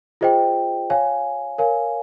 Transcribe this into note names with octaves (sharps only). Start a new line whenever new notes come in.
F4 G#4 C5 D#5 G5
C#5 F5 G#5
A#4 C#5 F5 G#5